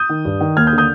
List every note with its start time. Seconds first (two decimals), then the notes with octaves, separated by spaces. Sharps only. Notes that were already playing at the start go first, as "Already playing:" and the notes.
Already playing: D#6 G6
0.09 D#3
0.25 G2
0.41 D#3
0.57 D#2 F6 G#6
0.67 D#6 G6
0.73 D3
0.78 D#6 G6